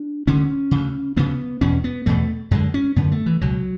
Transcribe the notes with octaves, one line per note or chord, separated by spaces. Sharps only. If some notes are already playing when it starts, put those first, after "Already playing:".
Already playing: D4
D2 D3 C#4
D2 C#3
D2 C#3 B3
E2 B2 C#4
B3
E2 B2 A3
F#2 D3 G#3
C#4
F#2 D3 B3
A3
E3
C#2 B2 F#3